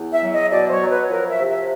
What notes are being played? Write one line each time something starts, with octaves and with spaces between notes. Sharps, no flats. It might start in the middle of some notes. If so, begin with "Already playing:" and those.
Already playing: E2
E5
F#3
D#5
B2 D5
C5
C#5
F#3
B4
F3 A#4
E5
C3
E5